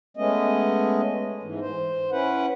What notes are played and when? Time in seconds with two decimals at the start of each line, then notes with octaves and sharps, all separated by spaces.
0.17 G#3 A3 B3 C#4 D#5
1.43 G#2 E3
1.60 C5
2.12 C#4 E4 B4 F#5